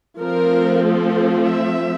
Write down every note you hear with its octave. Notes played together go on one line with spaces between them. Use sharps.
F3 A3 C4 A#4
A4
E5